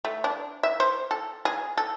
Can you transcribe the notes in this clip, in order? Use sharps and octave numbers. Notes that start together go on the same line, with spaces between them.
A3
D4
E5
C5
A4
G#4
A4